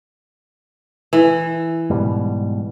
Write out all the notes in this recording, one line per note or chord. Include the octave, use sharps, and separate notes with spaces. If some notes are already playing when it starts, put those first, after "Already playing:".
E3
G#2 B2 G3